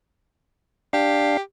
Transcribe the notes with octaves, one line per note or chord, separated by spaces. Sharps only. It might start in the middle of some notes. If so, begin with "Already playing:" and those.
D4 G4 F5